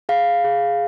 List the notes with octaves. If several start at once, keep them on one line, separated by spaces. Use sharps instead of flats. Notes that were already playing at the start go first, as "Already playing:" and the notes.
G#4 F5
G#4